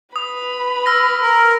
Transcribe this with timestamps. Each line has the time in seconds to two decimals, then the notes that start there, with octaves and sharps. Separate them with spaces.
0.16 B4 B5 D#6
0.86 E6 F6 A#6
1.22 A#4